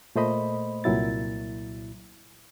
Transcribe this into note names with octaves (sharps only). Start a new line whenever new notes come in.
A#2 A3 C5 D#5 B5
C2 A#2 F#3 E4 A6